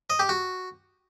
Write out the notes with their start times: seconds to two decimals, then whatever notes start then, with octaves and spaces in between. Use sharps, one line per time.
0.10 D#5
0.19 G4
0.29 F#4